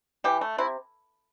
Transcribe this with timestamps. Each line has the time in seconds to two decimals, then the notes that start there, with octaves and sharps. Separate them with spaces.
0.24 E3 G4
0.41 A3
0.58 C3 E4